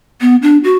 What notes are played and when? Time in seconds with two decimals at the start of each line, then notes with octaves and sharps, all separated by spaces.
0.21 B3
0.42 D4
0.64 F#4